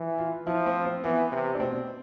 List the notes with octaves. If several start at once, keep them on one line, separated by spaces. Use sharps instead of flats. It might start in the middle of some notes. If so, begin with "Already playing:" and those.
Already playing: E3
F4
F3 E4
C4
C4
E3 B3
C3
D4
B2 C4